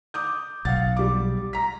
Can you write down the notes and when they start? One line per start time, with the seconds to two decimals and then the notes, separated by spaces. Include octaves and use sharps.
0.14 D6 D#6 G6
0.65 B1 F5 F#5 A6
0.97 G3 D6
1.53 A#5 B6